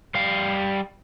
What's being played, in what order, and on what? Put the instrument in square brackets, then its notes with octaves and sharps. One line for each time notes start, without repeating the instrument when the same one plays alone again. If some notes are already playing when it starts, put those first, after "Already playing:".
[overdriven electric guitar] G3 F5